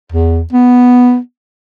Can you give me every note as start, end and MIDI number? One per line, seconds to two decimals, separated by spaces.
0.12 0.41 40
0.52 1.18 59